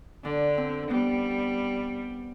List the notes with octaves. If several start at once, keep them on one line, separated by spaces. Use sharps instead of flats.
D3 D4
C4
G3 B3